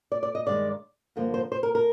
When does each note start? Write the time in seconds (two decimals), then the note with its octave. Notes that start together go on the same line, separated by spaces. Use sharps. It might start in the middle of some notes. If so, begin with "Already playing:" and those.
0.12 D5
0.23 D5
0.35 D#5
0.46 G2 D#3 G#3 D5
1.16 G2 D3 F3 A#3
1.34 C5
1.52 C5
1.63 A#4
1.75 A#4